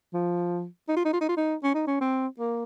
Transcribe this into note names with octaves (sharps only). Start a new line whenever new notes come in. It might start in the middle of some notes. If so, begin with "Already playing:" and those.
F3
D#4
F4
D#4
F4
D#4
F4
D#4
C#4
D#4
C#4
C4
A#3